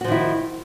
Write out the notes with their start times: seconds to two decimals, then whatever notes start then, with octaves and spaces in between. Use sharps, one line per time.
0.01 F#4
0.04 F3
0.08 D#3
0.12 E4